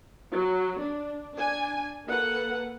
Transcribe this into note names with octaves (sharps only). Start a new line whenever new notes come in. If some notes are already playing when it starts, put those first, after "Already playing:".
F#3
D4
D4 G#5
A#3 A4 B4 F#5